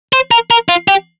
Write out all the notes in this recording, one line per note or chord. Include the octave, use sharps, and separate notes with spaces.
C5
A#4
A#4
F4
G4